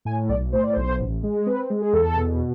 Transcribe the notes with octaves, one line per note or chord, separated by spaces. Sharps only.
A2 G#5
B1 D5
A2 C5
D5
B1 C5
A1
G#3
C4 B4
G#3
G#4
E2 A4
B2